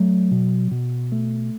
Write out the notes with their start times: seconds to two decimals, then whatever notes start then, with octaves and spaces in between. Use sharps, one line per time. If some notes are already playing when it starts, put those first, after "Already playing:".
Already playing: F#3 A3
0.31 B2
0.71 B2
1.12 A3